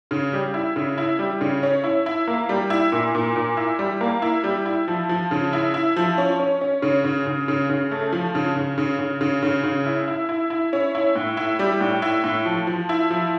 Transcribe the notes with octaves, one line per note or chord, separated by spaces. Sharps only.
C#3
G3
E4
C#3
E4
G3
C#3
C#4
E4
E4
A#3
G3
E4
A#2
A#2
A#2
E4
G3
A#3
E4
G3
E4
F3
F3
C#3
E4
E4
F3
C#4
C#4
C#4
C#3
C#3
C#3
C#3
C#3
A3
F3
C#3
C#3
C#3
C#3
C#3
C#3
C#3
E4
E4
E4
E4
C#4
E4
A2
E4
G3
A2
E4
A2
F3
F3
E4
F3